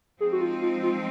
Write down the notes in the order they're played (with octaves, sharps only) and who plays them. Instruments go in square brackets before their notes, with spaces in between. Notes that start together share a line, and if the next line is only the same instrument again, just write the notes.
[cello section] F3 G#3 C4 D#4 [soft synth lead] G#4
[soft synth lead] F#4
F4
F4
F4